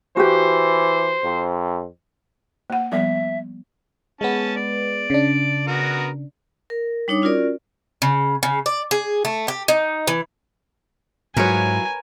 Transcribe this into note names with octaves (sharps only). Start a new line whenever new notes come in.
E3 F#4 G4 C5
F2
A#3 F#5
F3 G3 B3 E5
G#3 B3 C#4 A5
D5
C#3 D4
B3 F#4 A#4
A#4
G3 D4 D#4 C#5 D6 D#6
C#4 F4 F#4 A#4 D5
C#3
C#3
D5
G#4
A3
G4
D#4
E3
G#2 F#3 E4 F4 A#4 B4 C#5 G#5